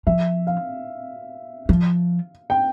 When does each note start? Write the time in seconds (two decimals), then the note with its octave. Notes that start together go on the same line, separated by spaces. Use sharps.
0.07 F3 E5
0.47 F5
1.69 F3
2.50 G5